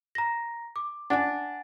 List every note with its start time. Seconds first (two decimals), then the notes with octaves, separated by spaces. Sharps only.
0.15 A#5 A#6
0.76 D6
1.10 D4 F#5 G#5 A6